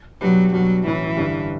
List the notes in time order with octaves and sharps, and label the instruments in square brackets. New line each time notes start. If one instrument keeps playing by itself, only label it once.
[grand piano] B2 G3 D4 G4 B4 [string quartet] F#3
[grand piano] B2 G3 D4 F#4 [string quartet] F#3
[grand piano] A2 F#3 C#4 E4 [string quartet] E3
[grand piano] G2 D3 G3 D4